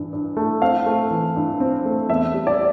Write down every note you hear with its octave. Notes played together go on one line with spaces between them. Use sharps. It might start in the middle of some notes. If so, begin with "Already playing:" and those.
Already playing: G2 E3
G2
A3
C4 F5
A3
E3
G2
C4
A3
E2 E5
G3
D5